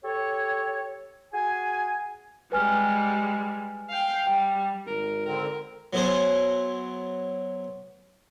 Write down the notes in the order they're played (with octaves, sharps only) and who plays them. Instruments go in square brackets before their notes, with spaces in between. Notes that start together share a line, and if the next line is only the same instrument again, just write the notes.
[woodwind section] G4 A4 C#5
F#4 G#4 G#5
[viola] G3 G#3 [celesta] B4 G#5 F6
[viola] F5 G5
[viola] G3 [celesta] G5
[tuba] G#1 [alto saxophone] A#4
[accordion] D3 C4 [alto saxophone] A#4
[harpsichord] F#3 B3 E4 G#4 C5